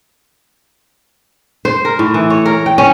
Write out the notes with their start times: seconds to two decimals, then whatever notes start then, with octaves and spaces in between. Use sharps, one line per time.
1.65 C5
1.85 A#4
1.99 A2
2.14 E3
2.30 C#5
2.46 A#4
2.66 G5
2.78 C#4